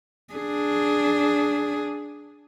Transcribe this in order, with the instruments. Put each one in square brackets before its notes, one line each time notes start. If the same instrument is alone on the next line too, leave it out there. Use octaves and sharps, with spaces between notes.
[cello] D4 G#4